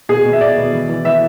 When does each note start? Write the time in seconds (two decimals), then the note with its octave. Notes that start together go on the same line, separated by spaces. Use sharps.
0.09 B2 G#4
0.25 B2
0.33 E5
0.41 B2 D5
0.57 B2
0.73 E3
0.89 E3
1.05 E3 E5